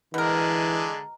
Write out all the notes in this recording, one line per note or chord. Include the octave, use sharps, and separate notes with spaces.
B2 D3 E3 G#3 A#4